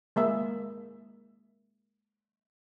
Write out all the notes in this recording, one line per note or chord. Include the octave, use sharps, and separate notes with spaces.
G#3 A#3 E5